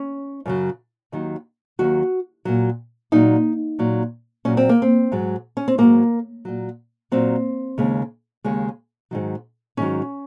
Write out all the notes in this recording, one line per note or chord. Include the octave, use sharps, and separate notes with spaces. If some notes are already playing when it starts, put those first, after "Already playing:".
Already playing: C#4
F#2 C#3 F#3
D#2 D#3 F#3
D#2 D#3 F#3 F#4
A#2 F#3
A#2 F#3 D#4
A#2 F#3
A#2 F#3 C#4
C4
A#3
C4
G#2 F#3
C#4
C4
G#2 F#3 A#3
A#2 F#3
A#2 F#3 C4
D#2 C#3 G#3
D#2 C#3 G#3
G#2 D#3 F#3
G#2 D#3 F#3 C#4